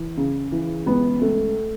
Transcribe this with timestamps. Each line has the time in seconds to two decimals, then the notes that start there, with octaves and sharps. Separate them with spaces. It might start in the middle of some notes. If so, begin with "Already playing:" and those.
Already playing: E3
0.17 C#3
0.52 E3
0.86 C#2 B3
1.21 C#2 A3